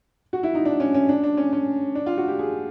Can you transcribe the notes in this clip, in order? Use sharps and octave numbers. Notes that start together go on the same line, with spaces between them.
F#4
E4
D#4
D4
C#4
C#4
D4
D4
C#4
C#4
D4
F4
F#4
G4
G#4